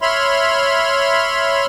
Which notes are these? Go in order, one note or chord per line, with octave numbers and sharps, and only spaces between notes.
C#5 E5 B5 C6 F6